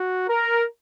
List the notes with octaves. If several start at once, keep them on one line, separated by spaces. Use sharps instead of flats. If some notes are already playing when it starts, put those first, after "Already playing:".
Already playing: F#4
A#4